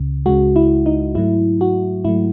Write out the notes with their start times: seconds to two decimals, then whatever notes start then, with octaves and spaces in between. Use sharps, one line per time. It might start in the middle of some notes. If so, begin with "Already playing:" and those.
Already playing: C#2 C#3
0.26 C#2 C#3 G#3 F#4
0.56 E4
0.86 D#4
1.15 G#2 F#3 A3 E4
1.61 F#4
2.05 G#2 F#3 A3 E4